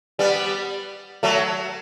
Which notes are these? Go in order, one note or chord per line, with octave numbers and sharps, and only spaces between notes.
G3 B3
F#3 A3